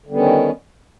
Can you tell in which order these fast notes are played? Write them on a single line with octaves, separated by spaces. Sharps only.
D3 G3 B3 D#3 C#4